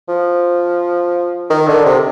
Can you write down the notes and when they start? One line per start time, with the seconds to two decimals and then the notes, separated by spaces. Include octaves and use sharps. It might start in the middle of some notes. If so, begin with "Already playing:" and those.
0.09 F3
1.50 D#3
1.68 D3
1.86 C3